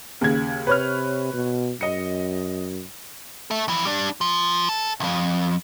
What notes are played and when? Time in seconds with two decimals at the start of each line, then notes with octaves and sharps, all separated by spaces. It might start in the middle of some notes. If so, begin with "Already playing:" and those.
0.21 D#2 C#3 G#6
0.67 C3 B4 C#5 F6
1.34 B2
1.81 F#2 D#5 C#7
3.51 A4 E5
3.68 F2 E3
3.85 G3 D4
4.21 F3
4.69 A4 A5
5.00 C2 F2